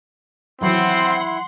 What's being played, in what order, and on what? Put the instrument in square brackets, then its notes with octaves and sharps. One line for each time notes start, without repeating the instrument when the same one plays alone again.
[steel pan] D#3 E3 F#3 [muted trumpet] C4 [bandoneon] E4 [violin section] F#5 C6